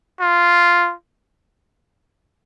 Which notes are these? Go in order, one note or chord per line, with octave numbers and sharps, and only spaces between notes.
F4